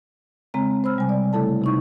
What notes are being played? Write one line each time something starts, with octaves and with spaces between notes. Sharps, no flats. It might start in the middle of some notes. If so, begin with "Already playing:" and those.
C#3 G#3 C4 A#5
C5 B5 E6 F6
C3 G3 G#5
D5
C#3 A3 E4 A4 A5
C3 D#4 C#6